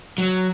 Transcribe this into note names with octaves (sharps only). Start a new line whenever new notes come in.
F#3